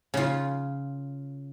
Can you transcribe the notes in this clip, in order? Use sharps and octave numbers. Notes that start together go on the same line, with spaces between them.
C#3 F4